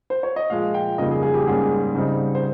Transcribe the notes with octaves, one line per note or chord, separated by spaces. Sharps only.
C5
C#5
D#5
A#2 F3 G#3 F5
G5
F2 C#3 G3 A#3 D#4 D#5
G#4
G#4
G4
G#2 G3 A#3 C#4 G#4
C#3 G3 C4 D#4
C5